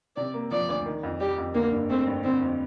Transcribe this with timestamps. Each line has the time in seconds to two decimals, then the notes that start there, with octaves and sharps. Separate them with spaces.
0.16 C3 D5
0.34 A#3
0.51 F3 D5
0.69 D2
0.86 D#3
1.03 F2
1.20 G3 G4
1.38 F2
1.54 D3 A#3
1.72 G2
1.90 A3 C4
2.07 G2
2.24 D3 C4
2.41 F2